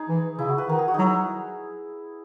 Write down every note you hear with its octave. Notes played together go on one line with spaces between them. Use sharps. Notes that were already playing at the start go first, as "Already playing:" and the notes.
Already playing: D#4 G#4
E3
C#3 E4
F#4
B4
D#3 A#4
G#4
F#4
F#3 D#4 E4